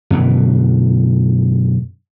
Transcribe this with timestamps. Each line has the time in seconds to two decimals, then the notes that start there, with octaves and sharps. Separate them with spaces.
0.10 F#2 B2 D3 E3